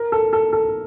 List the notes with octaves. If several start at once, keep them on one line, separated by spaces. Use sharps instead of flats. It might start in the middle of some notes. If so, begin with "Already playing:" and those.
Already playing: A#4
A4
A4
A4